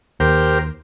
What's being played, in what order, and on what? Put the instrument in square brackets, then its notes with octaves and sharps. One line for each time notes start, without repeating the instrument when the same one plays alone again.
[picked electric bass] D#2 [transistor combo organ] G4 A#4 C5